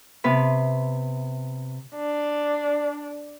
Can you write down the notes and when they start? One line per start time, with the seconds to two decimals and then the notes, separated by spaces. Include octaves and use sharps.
0.24 C3 B3 B4
1.95 D4